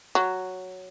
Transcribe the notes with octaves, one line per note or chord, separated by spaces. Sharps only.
F#3